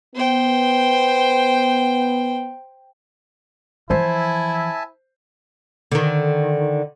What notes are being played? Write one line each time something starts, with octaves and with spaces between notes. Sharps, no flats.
B3 C5 G5
E3 F3 E4 C5 E5 G#5 A5
D3 D#3